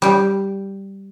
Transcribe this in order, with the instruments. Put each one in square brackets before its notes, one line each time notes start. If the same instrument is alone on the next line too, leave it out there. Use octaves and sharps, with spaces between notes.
[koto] G3 G4